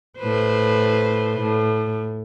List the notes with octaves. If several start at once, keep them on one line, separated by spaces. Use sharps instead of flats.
A2 B4 C5
A2